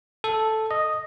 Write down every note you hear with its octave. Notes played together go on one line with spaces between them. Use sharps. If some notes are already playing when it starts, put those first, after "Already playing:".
A4
D#5